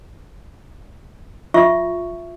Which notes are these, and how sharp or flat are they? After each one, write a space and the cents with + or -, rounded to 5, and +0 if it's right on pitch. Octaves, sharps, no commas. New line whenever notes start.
F4 +10 E5 +15 C#6 +0